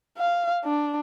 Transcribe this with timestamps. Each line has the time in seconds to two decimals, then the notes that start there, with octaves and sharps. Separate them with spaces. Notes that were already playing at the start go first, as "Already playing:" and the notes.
0.18 F5
0.65 D4